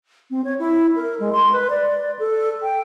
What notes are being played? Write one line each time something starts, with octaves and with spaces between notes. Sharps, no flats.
C4
C#5
E4
A#4
G#3
C6
B4
D5
A4
G5